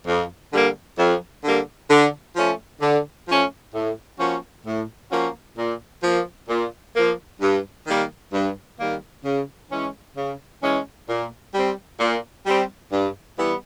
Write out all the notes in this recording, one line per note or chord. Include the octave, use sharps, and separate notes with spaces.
F2
D3 G3 A#3
F2
D3 G3 A#3
D3
F3 A3 C#4
D3
F3 A3 C#4
A2
F3 A#3 C#4 F#4
A2
F3 A#3 C#4 F#4
A#2
F3 A#3
A#2
F3 A#3
G2
D#3 G3 A#3
G2
D#3 G3 A#3
C#3
E3 G#3 C#4
C#3
E3 G#3 C#4
A#2
G3 C4
A#2
G3 C4
G2
E3 G3 B3